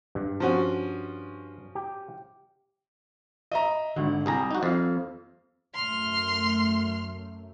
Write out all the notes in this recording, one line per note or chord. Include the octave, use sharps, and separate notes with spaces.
G2
F3 C#4 F#4
G4
D#5 E5 A#5
G#1 D3
C2 G3 G#4 A#5
D#4 F#4
F2 F5
F#2 A3 C6 F6